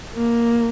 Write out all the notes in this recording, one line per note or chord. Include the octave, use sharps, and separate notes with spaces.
A#3